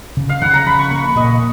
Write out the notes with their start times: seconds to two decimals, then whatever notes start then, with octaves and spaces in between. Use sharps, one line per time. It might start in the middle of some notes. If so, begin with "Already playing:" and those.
0.17 C#3
0.29 F5
0.42 C#3 F#5
0.54 A#5
0.66 F3 B5
0.79 C#6
0.91 A#3 C#6
1.04 B5
1.16 A#2 D#5